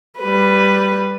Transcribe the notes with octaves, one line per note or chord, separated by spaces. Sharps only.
G3 B4